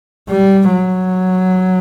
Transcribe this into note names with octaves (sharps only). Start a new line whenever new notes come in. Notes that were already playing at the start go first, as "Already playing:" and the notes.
G3
F#3